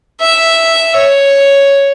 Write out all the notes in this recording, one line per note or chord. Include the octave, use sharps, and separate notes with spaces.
E5
C#5